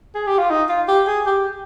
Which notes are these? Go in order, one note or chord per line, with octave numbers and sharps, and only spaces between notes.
G#4
G4
F4
D#4
F4
G4
G#4
G4